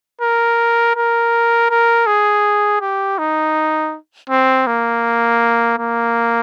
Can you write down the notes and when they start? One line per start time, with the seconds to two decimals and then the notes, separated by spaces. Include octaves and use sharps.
0.21 A#4
0.96 A#4
1.70 A#4
2.07 G#4
2.81 G4
3.18 D#4
4.30 C4
4.67 A#3
5.78 A#3